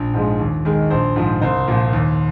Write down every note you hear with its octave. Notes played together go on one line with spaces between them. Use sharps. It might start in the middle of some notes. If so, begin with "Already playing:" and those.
Already playing: A#1
G#2 F3 G#3
D#2
D#3 G#3
A#1 C5
G#2 F3
C2 C5
A#2 F3
D#2